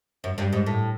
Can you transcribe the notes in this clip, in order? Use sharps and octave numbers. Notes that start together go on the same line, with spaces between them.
F#2
G2
G#2
A2